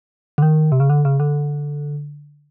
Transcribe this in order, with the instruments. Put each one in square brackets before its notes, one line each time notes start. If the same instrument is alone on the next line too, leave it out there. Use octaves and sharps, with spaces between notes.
[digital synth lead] D3
D#3
C3
C#3
D3
C#3
D3